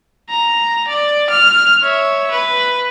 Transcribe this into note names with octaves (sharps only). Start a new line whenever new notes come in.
A#5
D5
F6
C#5 E5
B4